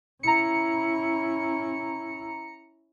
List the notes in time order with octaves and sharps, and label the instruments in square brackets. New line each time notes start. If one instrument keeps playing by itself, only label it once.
[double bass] C#4 E4 [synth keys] A#5 C#7